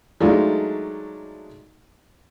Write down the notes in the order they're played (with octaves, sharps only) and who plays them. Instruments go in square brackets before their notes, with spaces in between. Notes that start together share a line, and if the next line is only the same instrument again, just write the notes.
[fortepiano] F#3 G#3 A3 D4 D#4 F4